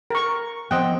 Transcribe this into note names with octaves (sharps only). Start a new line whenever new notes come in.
A#4 C#6
F3 B3 C4 D#5 F#5 G5